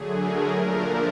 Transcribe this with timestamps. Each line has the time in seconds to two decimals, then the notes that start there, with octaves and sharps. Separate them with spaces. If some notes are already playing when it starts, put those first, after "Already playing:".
Already playing: D3 F#3 A3 G#4
0.13 A#4
0.51 A#2 F3 A3 D4